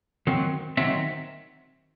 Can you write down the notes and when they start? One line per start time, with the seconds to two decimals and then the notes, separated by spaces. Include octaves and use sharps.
0.27 D#3 F#3 C4
0.77 D#3 F#3 C4 E5